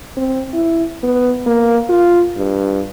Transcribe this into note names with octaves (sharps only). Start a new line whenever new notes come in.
C4
E4
B3
A#3
F4
G2